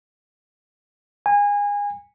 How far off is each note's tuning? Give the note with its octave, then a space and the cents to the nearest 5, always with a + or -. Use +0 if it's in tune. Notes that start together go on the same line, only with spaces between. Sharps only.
G#5 -25